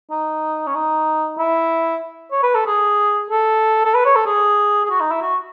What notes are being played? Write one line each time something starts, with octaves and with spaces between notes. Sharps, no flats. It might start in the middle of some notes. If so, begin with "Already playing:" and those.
D#4
C#4
D#4
E4
C#5
B4
A4
G#4
A4
A4
B4
C#5
A4
G#4
G#4
F#4
D#4
E4
F#4